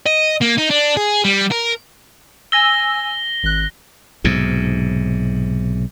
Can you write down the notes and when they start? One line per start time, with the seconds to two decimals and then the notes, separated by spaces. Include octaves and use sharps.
0.06 D#5
0.42 A#3
0.58 D#4
0.71 D4
0.97 G#4
1.24 G3
1.51 A#4
2.52 G#5 E6 A#6 G7
3.43 G#1 F#6
4.24 B1 G#2 C3